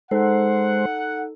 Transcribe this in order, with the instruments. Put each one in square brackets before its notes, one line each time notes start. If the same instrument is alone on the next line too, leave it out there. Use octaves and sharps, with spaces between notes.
[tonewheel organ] G#3 C5 [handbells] D#4 A4 [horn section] F#5